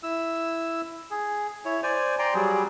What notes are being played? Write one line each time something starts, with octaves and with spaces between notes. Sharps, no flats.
E4 E6
G#4
E4 C#5
C5 D5 G#5
D5 G5 A#5 C6
F#3 G3 G#4